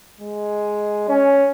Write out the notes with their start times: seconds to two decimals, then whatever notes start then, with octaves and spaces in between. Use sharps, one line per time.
0.20 G#3
1.09 C#4